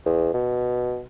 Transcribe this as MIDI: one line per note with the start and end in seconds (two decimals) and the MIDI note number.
0.06 0.29 40
0.34 1.02 47